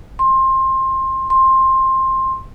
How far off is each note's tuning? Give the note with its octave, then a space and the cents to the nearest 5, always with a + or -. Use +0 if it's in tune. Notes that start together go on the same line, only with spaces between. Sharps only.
C6 +20
C6 +15